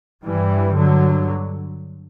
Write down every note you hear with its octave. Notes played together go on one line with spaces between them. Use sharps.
G2 E3 G3
D3 F#3